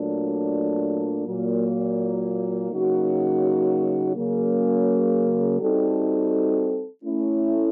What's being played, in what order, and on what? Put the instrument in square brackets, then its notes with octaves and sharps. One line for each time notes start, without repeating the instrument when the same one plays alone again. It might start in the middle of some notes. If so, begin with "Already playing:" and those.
Already playing: [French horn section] A#2 F#3 A3 D4
A#2 F#3 A#3
C#3 F#3 A#3 D#4 F#4
C#3 F#3 A#3
G3 C4 D#4 F#4 A4
A3 C#4 E4